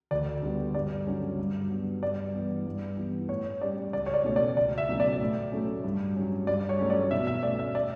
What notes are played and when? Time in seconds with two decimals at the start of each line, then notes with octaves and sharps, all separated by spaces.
0.11 D2 D5
0.42 D3 G3 B3
0.75 G2 D5
1.07 D3 F#3 C#4
1.38 G2
1.70 F#3 B3
2.03 G2 D5
2.34 E3 G3 B3
2.66 G2
2.97 E3 B3
3.29 A2 C#5
3.61 G3 C#4 D5
3.93 C#2 D5
4.06 C#5
4.14 D5
4.24 B2 A3 C#4
4.36 D5
4.56 C#2 D5
4.78 E5
4.89 B2 F#3 A3 C#4
5.00 D5
5.20 A2
5.52 F#3 A3 C#4
5.84 G2
6.16 F#3 C#4
6.47 G2 D5
6.69 C#5
6.79 F#3 A3 C#4
6.90 D5
7.11 B2 E5
7.27 E5
7.43 A3 C#4 D5
7.59 E5
7.75 D5